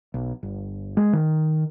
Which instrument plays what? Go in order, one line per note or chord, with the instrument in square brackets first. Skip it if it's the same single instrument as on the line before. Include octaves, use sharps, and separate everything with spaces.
[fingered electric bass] B1
G1
G#3
D#3